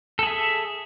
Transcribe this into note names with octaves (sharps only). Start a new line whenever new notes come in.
G#4 A4 E5